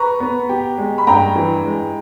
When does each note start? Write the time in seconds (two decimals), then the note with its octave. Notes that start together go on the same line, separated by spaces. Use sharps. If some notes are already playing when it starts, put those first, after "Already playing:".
Already playing: B4 A#5 C#6
0.20 B3
0.49 G4
0.78 G#3
0.98 B5
1.07 G2 G5 A#5
1.36 E3
1.65 G#3